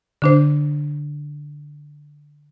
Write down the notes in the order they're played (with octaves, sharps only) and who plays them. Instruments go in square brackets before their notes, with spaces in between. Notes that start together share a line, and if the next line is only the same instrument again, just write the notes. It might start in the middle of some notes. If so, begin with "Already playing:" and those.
[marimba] D3 D4 C5